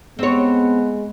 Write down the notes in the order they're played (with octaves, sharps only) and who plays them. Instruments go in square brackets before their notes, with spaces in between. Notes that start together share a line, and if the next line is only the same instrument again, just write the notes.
[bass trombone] G#3 [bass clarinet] B3 [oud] C4 C#5